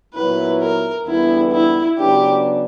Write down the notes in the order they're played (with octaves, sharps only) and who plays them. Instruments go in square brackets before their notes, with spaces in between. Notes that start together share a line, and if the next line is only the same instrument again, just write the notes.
[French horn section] A#2 F#3 B3 E4 [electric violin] B4
[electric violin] A#4
[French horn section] E2 D3 G3 B3 [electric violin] E4
[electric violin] E4
[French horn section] C#3 F#3 B3 D4 [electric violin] G4